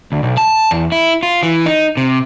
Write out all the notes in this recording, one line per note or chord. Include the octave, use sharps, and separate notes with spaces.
D2
B1
A5
E2
E4
F4
E3
D#4
C3